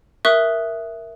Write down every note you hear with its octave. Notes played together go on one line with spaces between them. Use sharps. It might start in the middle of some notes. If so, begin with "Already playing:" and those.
A#4 E5 C#6 D#6 F#6